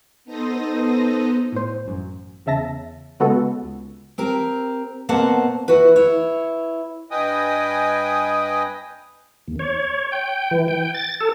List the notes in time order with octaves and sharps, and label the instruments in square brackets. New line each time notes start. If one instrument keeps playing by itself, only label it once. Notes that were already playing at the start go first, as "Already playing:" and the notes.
[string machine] B3 D#4 A4 C5 D#6 A#6
[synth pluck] A2 C5
A1 F#2
E2 C#3 E5 A5 A#6
C#3 G#3 B3 F#4 A4
C#2
[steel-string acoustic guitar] C4 G4 A#4
B2 A#3 C4 C5 F#5 A5
E4 F#4 B4
E4 C#5
[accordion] G2 B4 D#5 G5 G#5 D#6
[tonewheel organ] D#2
C#5
G5
E3
G5
A6
A4